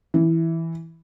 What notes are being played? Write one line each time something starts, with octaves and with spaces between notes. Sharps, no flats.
E3